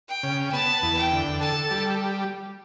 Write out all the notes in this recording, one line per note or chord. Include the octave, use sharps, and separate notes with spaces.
G5
C#3
B3 A5
E2
G5
D3
A4 A5
G3